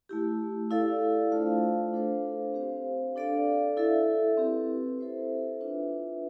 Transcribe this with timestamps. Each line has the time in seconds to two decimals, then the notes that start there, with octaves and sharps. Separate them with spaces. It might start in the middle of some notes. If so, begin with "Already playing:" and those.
0.09 A3 E4 G4
0.71 E4 A4 D5 F5
1.32 A3 D4 F4 C5 F5
1.93 D4 A4 C5 F5
2.54 C4 G4 C5 F5
3.16 D4 A4 D5 F5
3.77 E4 A4 E5
4.37 C4 G4 B4
4.99 E4 A4 C5 E5
5.61 D4 F4 B4 E5